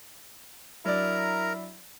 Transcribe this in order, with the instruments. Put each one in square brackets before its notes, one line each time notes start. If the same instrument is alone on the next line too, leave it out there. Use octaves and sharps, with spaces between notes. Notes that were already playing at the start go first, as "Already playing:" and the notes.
[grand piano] F#3 D4 D5 [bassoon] E4 [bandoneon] A#4 A#5